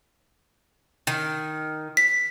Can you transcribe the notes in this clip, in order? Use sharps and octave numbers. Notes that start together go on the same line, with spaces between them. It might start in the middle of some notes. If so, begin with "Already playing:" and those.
D#3
B6